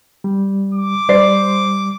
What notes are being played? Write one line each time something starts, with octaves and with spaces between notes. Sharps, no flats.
G3
D6
G3 C5 D5 C7